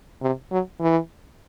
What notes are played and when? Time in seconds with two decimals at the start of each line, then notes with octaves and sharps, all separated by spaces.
0.22 C3
0.51 F#3
0.80 E3